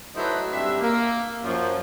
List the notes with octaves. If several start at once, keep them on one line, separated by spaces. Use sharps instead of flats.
F#3 A3 D#4 E4 B4 C5
G2 C4 D4 E5
A#3
F#2 F3